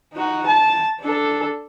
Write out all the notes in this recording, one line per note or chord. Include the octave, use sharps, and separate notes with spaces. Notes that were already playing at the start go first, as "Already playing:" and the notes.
D#4 F#4
A5
D4 A4